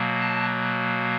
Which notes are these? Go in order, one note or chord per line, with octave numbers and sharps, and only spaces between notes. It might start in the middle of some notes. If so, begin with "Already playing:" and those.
Already playing: B2 F#3 A#3
A5